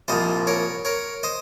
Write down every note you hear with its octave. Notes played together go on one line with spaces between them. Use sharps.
C2 A#2 F3 C5 D#5
A#4 C#5
A#4 C#5
C5 D#5